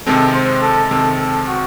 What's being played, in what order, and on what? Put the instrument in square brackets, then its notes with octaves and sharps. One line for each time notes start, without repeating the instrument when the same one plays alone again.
[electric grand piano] C3 D#3 G#3 C4 [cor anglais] A4
[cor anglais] C5
A4
[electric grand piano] C3 D#3 G#3 C4 [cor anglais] A4
[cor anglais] A4
F#4